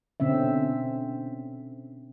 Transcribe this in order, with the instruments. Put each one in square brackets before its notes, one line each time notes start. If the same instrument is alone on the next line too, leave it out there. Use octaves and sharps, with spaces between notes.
[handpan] B2 D3 C4 C#4 E5